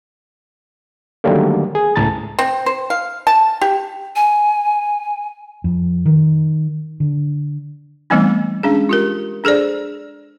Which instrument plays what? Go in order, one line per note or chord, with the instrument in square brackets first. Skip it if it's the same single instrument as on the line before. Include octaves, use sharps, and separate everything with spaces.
[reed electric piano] D3 D#3 F#3 G3 A3 A#3
G#4
C#2 A2 A5 A#5 A6
[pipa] C4
C5
F5
A5
G4
[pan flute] G#5
[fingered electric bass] F2
D#3
D3
[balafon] E3 G3 A3 B3 C4 D#4
G#3 C#4 D4 G#4
F4 G4 A#4
D4 G#4 A4 C5 D5